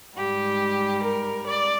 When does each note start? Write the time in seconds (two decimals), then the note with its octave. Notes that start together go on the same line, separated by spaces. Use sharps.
0.16 G#2 G3 G4
1.04 A#4
1.46 D5